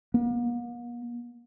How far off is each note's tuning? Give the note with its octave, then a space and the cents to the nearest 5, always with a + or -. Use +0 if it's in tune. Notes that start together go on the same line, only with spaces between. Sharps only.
A#3 +45